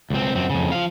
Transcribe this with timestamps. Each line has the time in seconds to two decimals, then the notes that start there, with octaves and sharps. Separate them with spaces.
0.10 C#2 C4
0.35 F#2 C4
0.50 F2 C#3
0.72 F3 F5